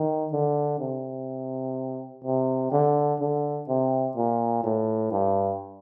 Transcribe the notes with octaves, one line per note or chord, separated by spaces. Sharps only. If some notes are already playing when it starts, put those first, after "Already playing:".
Already playing: D#3
D3
C3
C3
D3
D3
C3
A#2
A2
G2